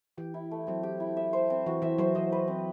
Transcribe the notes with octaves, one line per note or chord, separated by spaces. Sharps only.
E3 G4
E4
A3
F#3 C4
G4
E4
E5
C5
C4
E3 F#4
E3 E5
F#3 C5
E3 D#5
B4
C4